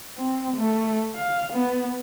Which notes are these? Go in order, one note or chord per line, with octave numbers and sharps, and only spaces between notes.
C4
A3
F5
B3